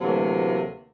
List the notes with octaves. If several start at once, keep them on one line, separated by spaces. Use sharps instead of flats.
D2 C3 E3 F#3 A3 A#3